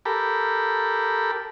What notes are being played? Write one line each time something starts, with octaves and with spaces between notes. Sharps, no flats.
G4 A4 A#4 B5